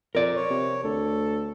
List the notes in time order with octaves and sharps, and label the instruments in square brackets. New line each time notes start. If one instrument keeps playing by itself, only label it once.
[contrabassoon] F2 [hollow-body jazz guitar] A#4 D5
[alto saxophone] C#5
[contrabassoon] C3
[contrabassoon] D2 [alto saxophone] A4